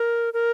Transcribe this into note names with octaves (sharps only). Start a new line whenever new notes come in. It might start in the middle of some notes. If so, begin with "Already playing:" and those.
Already playing: A#4
A#4